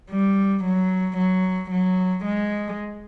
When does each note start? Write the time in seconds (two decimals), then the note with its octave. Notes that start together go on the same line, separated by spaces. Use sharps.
0.11 G3
0.64 F#3
1.18 F#3
1.71 F#3
2.25 G#3